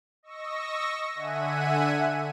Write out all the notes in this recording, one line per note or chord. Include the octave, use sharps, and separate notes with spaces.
D#5 C#6 E6 A#6
D3 E5 F#5 G#5 D#7